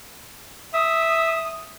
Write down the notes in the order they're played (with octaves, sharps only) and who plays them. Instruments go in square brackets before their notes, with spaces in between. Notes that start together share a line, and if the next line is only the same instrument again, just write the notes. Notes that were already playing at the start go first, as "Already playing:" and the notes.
[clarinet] E5 [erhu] D#6